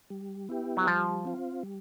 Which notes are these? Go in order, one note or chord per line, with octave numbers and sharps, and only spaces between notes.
G3
B3 E4 G4
F#3
F3 G3
C4 F4
G3